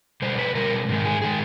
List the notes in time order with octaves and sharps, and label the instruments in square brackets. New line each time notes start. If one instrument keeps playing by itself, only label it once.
[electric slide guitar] B2 G3 C5
B4
B2 G3 A#4
G#2 D#3 G#3
G#4
D#3 G#3 G#4